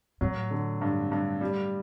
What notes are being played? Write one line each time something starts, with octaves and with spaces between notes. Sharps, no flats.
A2 F#3
D3
G2
G2
G3